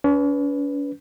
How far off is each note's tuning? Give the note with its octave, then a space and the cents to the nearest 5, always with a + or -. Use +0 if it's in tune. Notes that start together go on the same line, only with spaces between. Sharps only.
C#4 +45 B4 +0